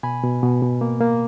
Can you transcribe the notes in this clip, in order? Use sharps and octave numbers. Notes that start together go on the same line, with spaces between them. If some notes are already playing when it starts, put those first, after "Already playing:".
B2 G#5 B5
B2
B2
B2
A#3
A#3